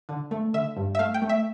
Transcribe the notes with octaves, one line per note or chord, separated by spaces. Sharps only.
D3
A3
D3 E5
G2
E5
A3 F5
G5
A3
E5